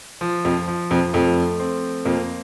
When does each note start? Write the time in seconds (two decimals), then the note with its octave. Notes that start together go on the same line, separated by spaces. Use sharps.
0.21 F3
0.45 F2
0.68 F3
0.90 F2
1.13 F2 A3
1.60 C4
2.05 F2 A#3